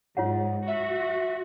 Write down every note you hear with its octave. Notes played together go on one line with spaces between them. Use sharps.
G#2 F4 C#5 F#5
F#4 E5